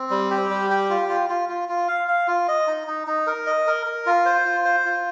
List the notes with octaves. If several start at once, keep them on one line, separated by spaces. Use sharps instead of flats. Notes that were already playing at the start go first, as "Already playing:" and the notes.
Already playing: C4
G3
G4
G3
G4
F4
F4
F4
F4
F4
F5
F5
F4
D#5
D#4
D#4
D#4
A#4
D#5
A#4
A#4
F4
C5
F4
C5
F4